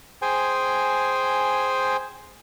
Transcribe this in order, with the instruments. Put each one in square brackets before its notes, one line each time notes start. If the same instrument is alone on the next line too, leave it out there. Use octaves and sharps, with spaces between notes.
[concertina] G#4 C5 G5 G#5